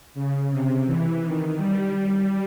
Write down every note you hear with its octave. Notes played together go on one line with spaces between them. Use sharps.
C#3
C3
E3
D#3
G3
G3